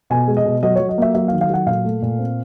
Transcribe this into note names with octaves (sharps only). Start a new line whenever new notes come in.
B2 G#5
G#3
D#5
B2
F#3 D#5
F#3 C#5
D#5
A#3 E5
F#3 E5
F5
D#3
F5
F#3 F#5
A#2 F5
A3
A#2
C4